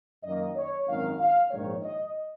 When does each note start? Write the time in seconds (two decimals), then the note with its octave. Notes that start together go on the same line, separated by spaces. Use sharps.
0.24 F#2 D#3 A#3 D#5
0.56 C#5
0.87 G#1 F#2 D#3 F5
1.19 F5
1.50 A#1 G#2 D#3 A#3 C#5
1.82 D#5